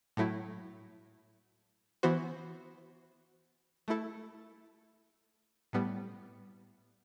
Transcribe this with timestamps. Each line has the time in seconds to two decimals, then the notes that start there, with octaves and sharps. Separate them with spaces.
0.17 A2 F#3 A3 E4
2.03 E3 B3 F#4 C5
3.88 A3 E4 A4
5.73 A2 G3 B3